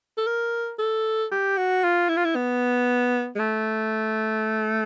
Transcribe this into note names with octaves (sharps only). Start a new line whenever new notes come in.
A4
A#4
A4
G4
F#4
F4
E4
F4
E4
B3
G#3
A3